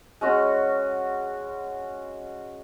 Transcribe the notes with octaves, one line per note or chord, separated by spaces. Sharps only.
G#3 C#4 F#4